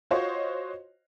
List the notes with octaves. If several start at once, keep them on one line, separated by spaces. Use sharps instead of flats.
F4 F#4 C5 C#5 D#5